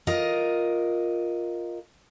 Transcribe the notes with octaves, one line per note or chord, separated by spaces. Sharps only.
F4 A#4 D#5